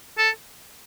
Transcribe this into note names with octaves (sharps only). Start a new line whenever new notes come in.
A4